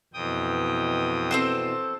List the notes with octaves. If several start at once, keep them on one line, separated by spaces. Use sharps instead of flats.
F2 B2 E3 G5 D#6
C4 A4 C5